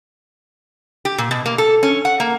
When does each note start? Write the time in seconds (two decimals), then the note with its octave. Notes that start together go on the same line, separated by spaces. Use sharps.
1.05 G4
1.18 A#2
1.31 B2
1.46 A#3
1.58 A4
1.83 C#4
2.05 F#5
2.20 A#3